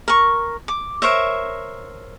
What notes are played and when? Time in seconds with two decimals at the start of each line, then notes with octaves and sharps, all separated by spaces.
0.08 A#4 C#6
0.68 D6
1.02 A#4 C5 C#5 E5